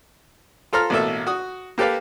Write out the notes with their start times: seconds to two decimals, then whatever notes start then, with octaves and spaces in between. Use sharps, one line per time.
0.73 F4 A4 C5 A#5 F6
0.90 A1 B2 A#3 A4 E5
1.27 F#4 D#6
1.78 A#3 G4 A4 B4 F5